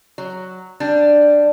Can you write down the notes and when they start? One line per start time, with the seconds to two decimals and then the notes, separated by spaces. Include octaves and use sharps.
0.18 F#3
0.80 G3 D4